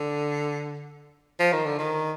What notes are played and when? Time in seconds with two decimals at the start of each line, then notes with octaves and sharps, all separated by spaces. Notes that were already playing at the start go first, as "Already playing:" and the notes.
Already playing: D3
1.39 F3
1.53 D#3
1.66 D3
1.79 D#3